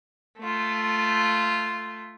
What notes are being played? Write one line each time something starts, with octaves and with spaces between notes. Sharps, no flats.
A3 F4